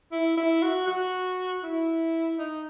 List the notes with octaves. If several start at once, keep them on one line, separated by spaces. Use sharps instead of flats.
E4
E4
F#4
F#4
E4
D#4